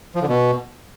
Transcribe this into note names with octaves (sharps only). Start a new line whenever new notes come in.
F3
D3
B2